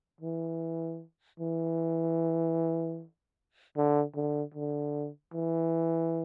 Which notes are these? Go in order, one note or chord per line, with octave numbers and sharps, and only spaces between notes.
E3
E3
D3
D3
D3
E3